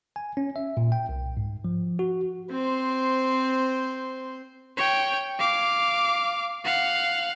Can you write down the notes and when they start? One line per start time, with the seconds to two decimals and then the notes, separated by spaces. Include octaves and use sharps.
0.16 G#5
0.37 C#4
0.56 E5
0.77 A#2
0.92 G5
1.09 C2
1.37 G#2
1.64 F3
1.99 F#4
2.50 C4 C5 C6
4.77 C#5 G5
5.39 F5 D6
6.65 F5 F#5